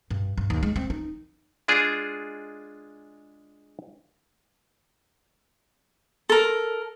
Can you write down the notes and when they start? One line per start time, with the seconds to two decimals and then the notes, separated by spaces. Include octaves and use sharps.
0.10 G2
0.38 G2
0.50 D#2
0.63 G#3
0.76 C4
0.90 D#4
1.68 G#3 D4 F4 G#4
6.29 A4 A#4